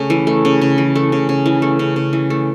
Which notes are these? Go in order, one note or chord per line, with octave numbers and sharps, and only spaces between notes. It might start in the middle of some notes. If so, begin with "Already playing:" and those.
Already playing: C#3 A3
E3
A3
C#3
C#3
E3
A3
C#3
C#3
E3
A3
C#3
C#3
E3
A3